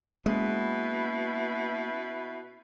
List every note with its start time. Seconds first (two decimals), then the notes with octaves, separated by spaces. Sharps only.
0.26 B2 G#3 A#3 B3 C#4 E4 B4